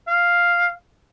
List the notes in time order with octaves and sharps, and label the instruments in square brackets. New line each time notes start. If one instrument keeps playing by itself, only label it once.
[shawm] F5